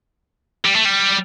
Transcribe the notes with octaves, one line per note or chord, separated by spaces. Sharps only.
G3
A3
G3